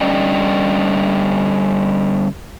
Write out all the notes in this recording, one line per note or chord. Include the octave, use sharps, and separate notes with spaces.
D3 G3 C#4 D5 D#5 G5